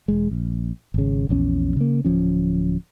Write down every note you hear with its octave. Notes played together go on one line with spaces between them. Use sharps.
E1 G#3
A#1
G#1 C#3
A#1 E2 C4 C#4
C#3 A#3
D1 F3 C#4